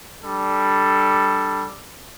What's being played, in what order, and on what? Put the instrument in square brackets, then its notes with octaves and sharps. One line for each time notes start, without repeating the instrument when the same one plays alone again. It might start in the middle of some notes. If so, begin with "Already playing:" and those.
[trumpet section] G3 D4 A4